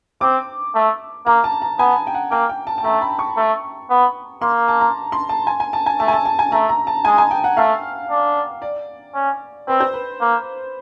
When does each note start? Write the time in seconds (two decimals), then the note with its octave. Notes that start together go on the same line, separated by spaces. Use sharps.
0.21 C4 D6
0.75 A3
1.26 A#3 A#5
1.44 A5
1.62 A#5
1.79 B3 G#5
2.07 G5
2.14 F#5
2.31 A#3 G5
2.49 G5
2.67 A5
2.78 A5
2.84 A3 A#5
3.01 B5
3.19 C#6
3.36 A3
3.90 B3
4.42 A#3 C6
4.68 A5
4.81 A#5
5.12 C6
5.29 A5
5.47 G#5
5.60 G#5
5.73 A5
5.86 G#5
6.00 A3 A5
6.08 G#5
6.13 A5
6.25 A5
6.39 G#5
6.52 A3 A#5
6.69 A#5
6.87 A5
7.05 G#3 G#5
7.18 G#5
7.31 G5
7.44 F#5
7.57 A3 F5
8.10 D4
8.62 D5
9.14 C#4
9.67 C4 B4
9.80 C5
9.94 B4
10.20 A#3